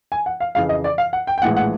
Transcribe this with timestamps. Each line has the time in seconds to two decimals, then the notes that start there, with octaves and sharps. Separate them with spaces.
0.12 G#5
0.26 F#5
0.40 F5
0.55 F2 C#3 E3 F5
0.69 D#5
0.84 D5
0.98 F5
1.13 F#5
1.27 G5
1.38 G5
1.42 A#1 A2 E3 G#3 F#5
1.56 F#5